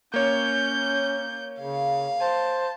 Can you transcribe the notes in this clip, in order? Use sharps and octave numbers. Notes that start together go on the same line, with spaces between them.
A#3 C#4 C#5 G6
C#3 F5
C5 A5